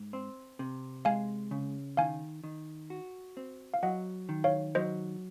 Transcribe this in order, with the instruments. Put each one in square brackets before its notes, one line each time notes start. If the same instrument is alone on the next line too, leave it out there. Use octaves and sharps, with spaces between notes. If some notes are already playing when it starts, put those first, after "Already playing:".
Already playing: [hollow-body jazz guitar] G#2
C4
C3
[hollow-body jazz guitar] G#3 [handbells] F5 G#5
[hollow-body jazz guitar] C#3
[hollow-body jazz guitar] D#3 [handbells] F5 G#5
[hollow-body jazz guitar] D#3
F#4
C4
[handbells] F5
[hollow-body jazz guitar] F#3 [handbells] D#5 F#5
[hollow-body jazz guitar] D#3
[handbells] C#5 F5
[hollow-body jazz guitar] F#3 [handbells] C5 D#5